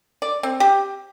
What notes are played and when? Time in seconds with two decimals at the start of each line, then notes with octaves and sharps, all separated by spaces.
0.22 D5
0.43 C4
0.60 G4